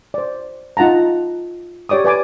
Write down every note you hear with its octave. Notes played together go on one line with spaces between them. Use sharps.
C5 D5
D#4 F4 F#5 A5 A#5
G4 C#5 D5 D6 D#6
B4 D5 G#5 D6